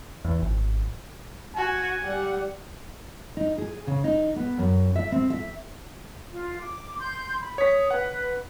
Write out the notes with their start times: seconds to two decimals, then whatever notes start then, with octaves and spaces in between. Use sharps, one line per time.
0.25 E2
0.42 G#1
1.57 F#4 G#5
2.03 G3 F#5
3.37 D#4
3.58 G#4
3.87 C#3
4.04 D#4
4.36 B3
4.58 F#2
4.96 E5
5.12 C4
5.30 E5
6.32 F4
6.59 D6
6.99 C6 G6
7.40 B5
7.58 C#5 D#6 B6
7.91 B4 F#5